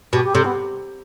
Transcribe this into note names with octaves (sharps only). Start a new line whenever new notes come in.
B2 G4
G4
C3 A4
B3